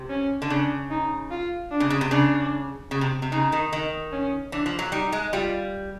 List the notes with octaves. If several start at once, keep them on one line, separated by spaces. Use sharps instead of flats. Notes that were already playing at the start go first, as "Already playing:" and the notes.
Already playing: C3
C#4
D3
C#3 D4
D#4
F4
D4
C#3
C#3
C3
C#3 D4
C#3
C3
C3
C#3 D#4
D#3
D#3
C#4
E3 D4
F3
F#3
G3 D#4
G#3
G3 F4